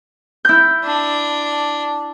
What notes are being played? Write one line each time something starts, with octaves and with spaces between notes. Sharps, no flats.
E4 G6
D4